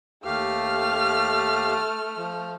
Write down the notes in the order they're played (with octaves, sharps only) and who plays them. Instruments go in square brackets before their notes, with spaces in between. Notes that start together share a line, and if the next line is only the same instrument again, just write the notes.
[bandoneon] D#2 G4 F5 [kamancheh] A3 F6
[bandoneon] F3